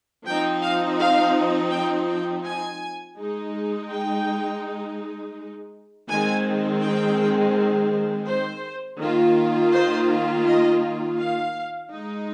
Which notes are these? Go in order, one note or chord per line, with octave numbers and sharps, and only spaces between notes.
F3 C4 D#4 G5
F5
F5
G5
G5
G#5
G#3 D#4
G5
D#3 G#3 C4 G#5
G5
C5
D#3 A#3 F4
C5
D#5
F5
G#3 D#4